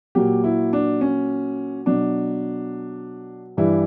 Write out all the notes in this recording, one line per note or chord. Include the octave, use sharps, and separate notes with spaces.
A#2 F#3 G4
E4
D4
C#4
B2 F#3 D4
G2 E3 G3 E4